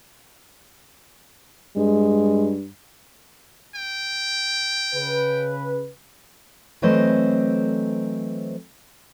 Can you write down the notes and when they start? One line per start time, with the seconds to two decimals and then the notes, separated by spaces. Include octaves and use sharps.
1.77 G2 G#3
3.75 G5
4.94 C#3 B4
6.82 E3 F#3 A3 C4 C5 D#5